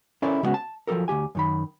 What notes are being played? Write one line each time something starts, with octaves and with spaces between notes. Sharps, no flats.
C#4 E4 A4 A#4 C5 D5
C#3 G3 G#3 B3 C#4 F#4
A5
F3 F#3 F#4 A4 A#4
D2 F3 G4 G#5
F#2 D#3 B5